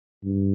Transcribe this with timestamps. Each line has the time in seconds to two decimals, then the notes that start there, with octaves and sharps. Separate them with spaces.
0.24 G2